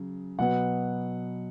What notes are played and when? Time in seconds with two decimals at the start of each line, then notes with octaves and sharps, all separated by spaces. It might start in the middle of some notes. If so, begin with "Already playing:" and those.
Already playing: C#3 F#3
0.38 B2 F#3 B3 F#5